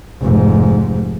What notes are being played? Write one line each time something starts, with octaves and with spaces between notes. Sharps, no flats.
F1 G#2